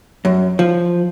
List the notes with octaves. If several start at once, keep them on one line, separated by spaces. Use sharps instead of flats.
F#2
F3